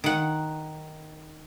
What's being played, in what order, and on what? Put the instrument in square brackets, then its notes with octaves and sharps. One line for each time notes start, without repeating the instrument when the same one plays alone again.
[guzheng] D#3 F#5